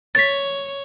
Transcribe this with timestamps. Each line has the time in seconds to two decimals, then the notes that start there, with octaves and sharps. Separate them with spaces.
0.15 C#5 A6 B6